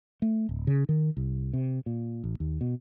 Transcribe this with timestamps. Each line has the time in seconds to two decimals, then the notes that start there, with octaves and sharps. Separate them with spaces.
0.22 A3
0.49 D1
0.67 C#3
0.89 D#3
1.17 C2
1.53 C3
1.86 A#2
2.24 A1
2.40 D#2
2.61 B2